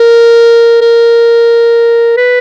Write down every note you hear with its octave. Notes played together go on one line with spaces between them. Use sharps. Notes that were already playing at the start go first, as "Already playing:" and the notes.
Already playing: A#4
A#4
B4